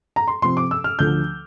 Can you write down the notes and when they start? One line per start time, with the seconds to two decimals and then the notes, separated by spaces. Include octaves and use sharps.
0.16 A#5
0.28 C6
0.42 C3 F3 C4 C6
0.57 D6
0.71 E6
0.84 F6
0.99 D2 D3 F3 G6